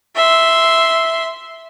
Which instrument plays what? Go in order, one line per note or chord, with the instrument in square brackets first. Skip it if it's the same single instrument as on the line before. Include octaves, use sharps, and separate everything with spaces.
[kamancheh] E5 C6